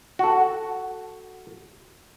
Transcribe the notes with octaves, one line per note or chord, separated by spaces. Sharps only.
F#4 A4